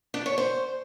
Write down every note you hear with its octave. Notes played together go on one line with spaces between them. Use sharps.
D4
C#5
C5